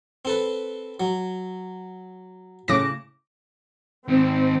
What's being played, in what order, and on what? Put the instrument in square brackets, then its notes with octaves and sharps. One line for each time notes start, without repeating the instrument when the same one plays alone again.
[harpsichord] C4 A4 B4
F#3
[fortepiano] A2 C#3 [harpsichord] A5 [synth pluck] D6 A#6
[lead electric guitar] G#2 D#3 [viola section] C4